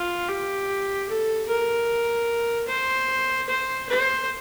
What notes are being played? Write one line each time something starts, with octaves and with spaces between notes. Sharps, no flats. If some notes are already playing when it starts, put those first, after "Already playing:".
Already playing: F4
G4
A4
A#4
C5
C5
C5